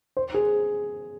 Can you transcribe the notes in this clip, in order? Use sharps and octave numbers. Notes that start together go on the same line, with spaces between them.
C5
G#4